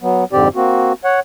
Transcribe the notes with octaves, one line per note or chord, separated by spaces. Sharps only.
F#3 B3
F2 G#2 D3 C4 G4 D5
A#3 C4 F#4
C#5 F#5